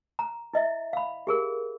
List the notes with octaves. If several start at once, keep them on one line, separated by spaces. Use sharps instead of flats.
A#5
E4 D#5 E5
F5 B5
G4 G#4 A#4